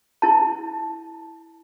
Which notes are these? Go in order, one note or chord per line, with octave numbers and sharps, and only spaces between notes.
E4 A5